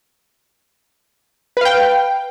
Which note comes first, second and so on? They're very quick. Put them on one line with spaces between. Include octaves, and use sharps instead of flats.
B4 F5 G5